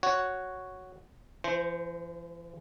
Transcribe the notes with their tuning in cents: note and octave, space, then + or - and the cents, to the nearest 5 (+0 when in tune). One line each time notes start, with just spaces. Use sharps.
F#4 +0 C#5 +0
E3 +45 C5 -5